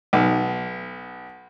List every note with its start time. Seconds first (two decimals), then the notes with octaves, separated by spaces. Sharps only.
0.13 B1